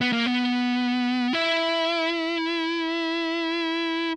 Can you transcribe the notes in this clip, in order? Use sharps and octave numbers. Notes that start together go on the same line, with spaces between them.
B3
A#3
B3
E4